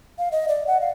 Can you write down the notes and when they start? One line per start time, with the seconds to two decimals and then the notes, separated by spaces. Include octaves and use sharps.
0.18 F5
0.32 D#5
0.48 D5
0.67 F#5
0.80 F5